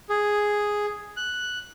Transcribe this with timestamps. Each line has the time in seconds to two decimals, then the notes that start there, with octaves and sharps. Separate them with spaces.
0.09 G#4
1.17 F#6